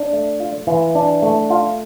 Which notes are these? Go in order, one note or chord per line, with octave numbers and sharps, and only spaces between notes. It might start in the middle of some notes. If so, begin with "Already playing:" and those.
Already playing: D4
A3
F4
E3
D4
A3
F4